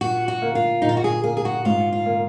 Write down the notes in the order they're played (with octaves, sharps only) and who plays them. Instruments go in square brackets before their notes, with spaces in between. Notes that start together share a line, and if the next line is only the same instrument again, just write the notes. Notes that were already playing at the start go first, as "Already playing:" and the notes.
[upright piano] A#2 [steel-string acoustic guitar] F#4
[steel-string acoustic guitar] F#4
[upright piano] A#3
[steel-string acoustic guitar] F4
[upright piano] A#2 [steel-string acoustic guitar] D#4
[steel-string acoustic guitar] F4
F#4
G#4
[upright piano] A#3 [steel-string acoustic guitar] G#4
[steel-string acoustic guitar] G#4
F#4
[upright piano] G#2 [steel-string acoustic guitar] F4
[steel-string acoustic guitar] F4
[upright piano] A#3